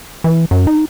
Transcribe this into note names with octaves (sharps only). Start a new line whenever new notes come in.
E3
F#2
D#4